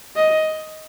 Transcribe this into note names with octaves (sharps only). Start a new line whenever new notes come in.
D#5